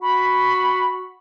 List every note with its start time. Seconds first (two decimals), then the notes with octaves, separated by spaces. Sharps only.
0.02 F#4 B5